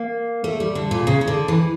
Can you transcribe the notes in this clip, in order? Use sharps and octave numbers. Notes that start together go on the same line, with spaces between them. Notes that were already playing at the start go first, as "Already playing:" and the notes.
Already playing: A#3
A3
G3
D3
A#2
C#3
C#3
D3
E3